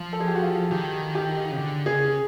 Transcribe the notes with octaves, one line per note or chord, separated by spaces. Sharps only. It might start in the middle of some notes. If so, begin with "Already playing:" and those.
Already playing: F3
A4
G#4
G4
F#4
F4
D#3 G4
G4
C#3
D3
C#3 G#4